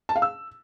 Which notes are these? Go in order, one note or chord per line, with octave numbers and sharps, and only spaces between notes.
A5
F5
E6